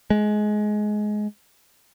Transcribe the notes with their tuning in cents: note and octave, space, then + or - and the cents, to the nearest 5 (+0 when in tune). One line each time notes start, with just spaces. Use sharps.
G#3 +20